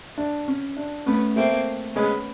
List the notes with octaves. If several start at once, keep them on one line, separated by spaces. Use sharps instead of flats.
D4
C#4
D4
A3 B3 C#4
A3 A#3 C4
G#3 B3 C#4